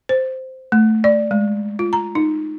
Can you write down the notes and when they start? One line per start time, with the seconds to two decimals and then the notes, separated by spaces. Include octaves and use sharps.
0.09 C5
0.72 A3
1.04 D5
1.31 G#3
1.79 F4
1.93 A#5
2.15 D#4